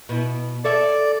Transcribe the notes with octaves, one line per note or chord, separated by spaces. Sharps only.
B2 E4
A4 C#5 D5 E5